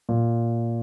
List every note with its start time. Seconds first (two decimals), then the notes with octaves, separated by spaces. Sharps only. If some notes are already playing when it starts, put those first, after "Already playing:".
0.09 A#2